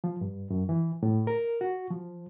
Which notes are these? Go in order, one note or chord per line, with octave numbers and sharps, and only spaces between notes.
F3
G2
F#2
E3
A2
A#4
F#4
F3